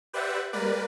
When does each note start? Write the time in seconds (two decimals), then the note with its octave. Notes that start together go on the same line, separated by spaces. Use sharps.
0.13 G4 B4 C5 D5 E5 F#5
0.53 G3 G#3 A#3 A#4 B4 D5